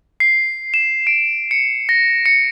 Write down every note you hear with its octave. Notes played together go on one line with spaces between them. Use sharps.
C7
E7
D7
C#7
A#6
C#7